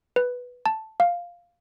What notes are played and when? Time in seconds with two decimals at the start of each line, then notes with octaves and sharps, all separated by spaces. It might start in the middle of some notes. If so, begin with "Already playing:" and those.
0.16 B4
0.66 A5
1.00 F5